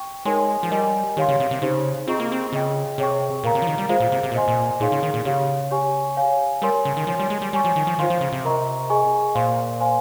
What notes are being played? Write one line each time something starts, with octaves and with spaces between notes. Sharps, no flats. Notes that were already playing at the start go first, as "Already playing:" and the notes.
Already playing: G5 C#6
G#3 D#4 A#4 C#5 G#5 C6
F3
G3 A#4 D#5 G#5
D#3 G4 C#5 F5 C6
C#3
C3
C3
C#3 D#4 G4 C5
C4 F4 G#4 D#5 A#5 C#6
A#3
C4
C#3 G#4 D#5 G5
C3 G#4 C#5 G5 C#6
A#2 A#4 F5 A#5
C3
F3
D#3
G3
G#3 F4 G#4 C5 F5
A#2
C3
C3
A#2
C5 D#5 G#5 C6
A#2
A#2 D#4 G#4 C#5 F5 C6
C#3
D#3
A#2
C#3 G4 C#5 F5
G4 C#5 G#5 C#6
C#5 F5 G#5
G3 A#4 C#5 G#5 C6
C#3
D#3
F3 C#5 G#5 C6
G3
G#3
G3
G3 C#5 G#5 C#6
F3
D#3
F3
D#3 F4 C5 F5 C6
F3
C#3
C3
A#4 D#5 A#5 C#6
G#4 D#5 G#5 C#6
A#2 C5 F5 C6
C5 F5 G#5 C6